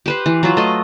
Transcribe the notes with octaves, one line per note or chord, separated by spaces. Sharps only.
G4 B4 C5
E3
F#3 F4
A3 D#5